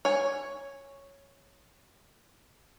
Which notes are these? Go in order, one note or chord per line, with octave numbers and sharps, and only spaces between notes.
C#5 G#5